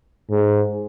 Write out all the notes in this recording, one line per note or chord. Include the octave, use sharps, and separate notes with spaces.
G#2